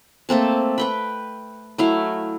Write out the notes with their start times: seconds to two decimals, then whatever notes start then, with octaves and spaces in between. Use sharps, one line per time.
0.29 A3 A#3 C4 A5
0.78 B4 G5 B5
1.78 F#3 A3 E4 F5